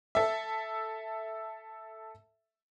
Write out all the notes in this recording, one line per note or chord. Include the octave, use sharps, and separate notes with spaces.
A4 E5